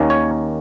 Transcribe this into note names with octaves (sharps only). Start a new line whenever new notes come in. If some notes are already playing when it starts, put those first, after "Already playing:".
Already playing: D#2 D#3 A#3 C#4
C#5